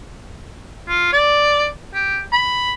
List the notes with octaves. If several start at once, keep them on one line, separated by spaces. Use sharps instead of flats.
F4
D5
G4
B5